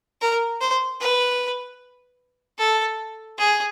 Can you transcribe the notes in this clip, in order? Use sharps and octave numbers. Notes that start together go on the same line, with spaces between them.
A#4
C5
B4
A4
G#4